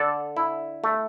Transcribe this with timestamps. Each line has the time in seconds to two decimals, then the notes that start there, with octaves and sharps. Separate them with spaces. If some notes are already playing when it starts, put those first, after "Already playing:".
Already playing: D3 A4 D5
0.37 E4
0.84 A3